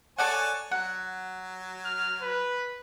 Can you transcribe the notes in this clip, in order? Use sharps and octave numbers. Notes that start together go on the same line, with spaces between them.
A4 C#5 D5 F#5 G#5 A5
F#3 F#5
F6
B4